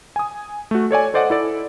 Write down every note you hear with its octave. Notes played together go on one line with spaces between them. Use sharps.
G#5 D#6
A3 F#4
A4 C#5 D5 G#5
A4 C5 D5 D#5 F#5
E4 A4 D5